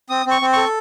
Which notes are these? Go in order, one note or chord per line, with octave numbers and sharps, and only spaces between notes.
C4 D#6
C4 C#6
C4
A4 C#6